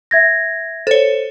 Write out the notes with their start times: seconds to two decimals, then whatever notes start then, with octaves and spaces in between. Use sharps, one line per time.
0.11 E5 G#6 A#6
0.87 A4 C5 C#5